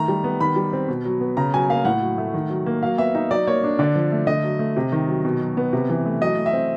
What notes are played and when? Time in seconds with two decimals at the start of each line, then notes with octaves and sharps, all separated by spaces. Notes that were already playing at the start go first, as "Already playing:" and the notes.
Already playing: D#3 A3 A#5
0.08 G3
0.24 B3
0.40 D#3 B5
0.56 G3
0.73 C4
0.88 B2
1.05 F#3
1.21 B3
1.37 C#3 A#5
1.54 F#3 G#5
1.70 A#3 F5
1.85 A2 F#5
2.01 F#3
2.18 A3
2.34 D#3
2.50 F#3
2.66 A#3
2.83 F#3 F5
2.98 B3 E5
3.14 D#4 E5
3.30 F#3 D5
3.47 A#3 C#5
3.64 D4
3.79 D3 D5
3.95 F3
4.12 A3
4.27 D3 D#5
4.44 F#3
4.59 A3
4.76 C3
4.92 D#3
5.08 F#3
5.25 B2
5.41 F#3
5.57 B3
5.73 C3
5.89 E3
6.06 A3
6.21 F#3 D#5
6.37 A3
6.46 E5
6.53 C4